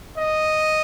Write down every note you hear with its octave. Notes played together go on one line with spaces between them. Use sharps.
D#5